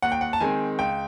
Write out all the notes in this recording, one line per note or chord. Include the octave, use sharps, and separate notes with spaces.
D#2 F#5
G5
F#5
A5
D#3 G#3 C4 G#5
C#2 G5